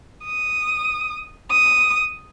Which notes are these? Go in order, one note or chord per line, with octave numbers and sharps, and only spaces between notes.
D#6
D#6